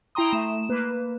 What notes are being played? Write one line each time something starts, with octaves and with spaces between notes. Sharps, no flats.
E4 G5 A#5 C6 D#6
A3 E7
A#3 B4